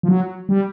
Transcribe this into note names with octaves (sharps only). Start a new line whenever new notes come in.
F3
F#3
G3